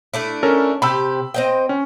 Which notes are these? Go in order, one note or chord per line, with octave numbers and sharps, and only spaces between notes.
A3 D4 E4
C#4 A4 A#4
C3 G4 B5 E6
C4 D#5 G5
C#4